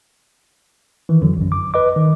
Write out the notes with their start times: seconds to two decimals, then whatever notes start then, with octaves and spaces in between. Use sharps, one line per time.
1.09 D#3 E3
1.21 F2 D3 F#3
1.37 A#1 F#2
1.52 D6
1.74 B4 D#5 D6
1.96 D#3